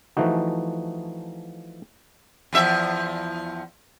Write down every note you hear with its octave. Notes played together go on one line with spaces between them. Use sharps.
E3 F3 A3 D#4 F#4
E2 F3 E5